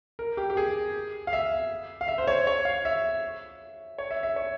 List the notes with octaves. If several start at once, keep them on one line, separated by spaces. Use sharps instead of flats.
A#4
G4
G4
G#4
F5
E5
F5
E5
C5
C#5
C#5
F5
E5
C#5
E5
E5
C#5